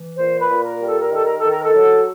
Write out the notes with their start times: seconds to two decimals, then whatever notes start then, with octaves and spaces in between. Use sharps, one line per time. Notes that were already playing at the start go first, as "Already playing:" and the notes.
Already playing: E3
0.17 A#2 C5
0.40 B4
0.48 A#2
0.64 A#4
0.79 G3
0.88 A4
1.00 A#4
1.11 D#3 A4
1.25 A#4
1.38 D#3 A4
1.51 A#4
1.64 A4
1.74 F#3